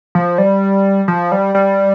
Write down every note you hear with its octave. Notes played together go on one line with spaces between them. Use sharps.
F3
G3
F3
G3
G3